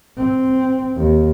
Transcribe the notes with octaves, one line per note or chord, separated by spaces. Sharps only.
C4
D#2